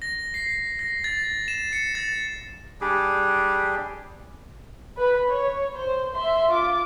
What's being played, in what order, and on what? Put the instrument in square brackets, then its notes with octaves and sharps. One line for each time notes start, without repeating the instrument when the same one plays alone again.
[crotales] A#6
C7
A#6
A6
E7
C#7
A6
[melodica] G3 D4 G4 G#4
[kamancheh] B4 B5
C#5
C5
E5 C6
F4 D6